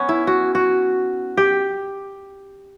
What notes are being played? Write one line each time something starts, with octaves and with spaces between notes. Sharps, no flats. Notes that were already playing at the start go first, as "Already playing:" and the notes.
Already playing: B3 C#4
E4
F#4
F#4
G4